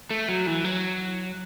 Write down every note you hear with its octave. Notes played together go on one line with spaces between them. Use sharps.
A3
F#3
E3
F#3